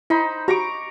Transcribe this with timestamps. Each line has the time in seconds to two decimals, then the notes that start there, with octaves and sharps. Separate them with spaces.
0.10 D#4 E4 C5 B5
0.48 F#4 G4 A#5 C#6 D6